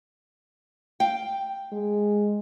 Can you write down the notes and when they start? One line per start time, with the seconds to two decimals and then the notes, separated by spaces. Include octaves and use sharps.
1.00 F5 G5
1.72 G#3